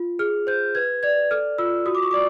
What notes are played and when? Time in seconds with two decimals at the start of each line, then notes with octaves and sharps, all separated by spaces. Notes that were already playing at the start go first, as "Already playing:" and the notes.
Already playing: F4
0.19 G#4 F6
0.47 C5 G6
0.75 B4 G#6
1.03 D5 G#6
1.31 A4 F6
1.58 F4 E6
1.86 F#4 D#6
1.95 D6
2.03 C#6
2.11 D5 D6